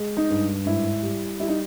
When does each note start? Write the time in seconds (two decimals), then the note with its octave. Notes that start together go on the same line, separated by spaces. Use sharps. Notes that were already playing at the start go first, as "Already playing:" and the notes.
Already playing: G#3
0.17 D#4
0.30 G2
0.66 G#2 E4
1.02 G3
1.40 G3 E4
1.48 D#4